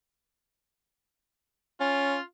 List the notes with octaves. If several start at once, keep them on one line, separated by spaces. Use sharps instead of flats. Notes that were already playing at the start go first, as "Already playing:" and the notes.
C#4 F4